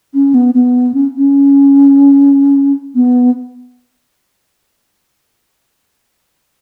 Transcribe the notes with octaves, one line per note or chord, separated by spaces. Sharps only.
C#4
B3
B3
C#4
C#4
B3